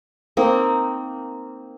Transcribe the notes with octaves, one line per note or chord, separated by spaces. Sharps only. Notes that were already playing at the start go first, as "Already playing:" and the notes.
A#3 C4 D#4